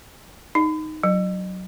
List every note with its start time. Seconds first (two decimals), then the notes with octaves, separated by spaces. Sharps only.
0.55 D#4
1.03 F#3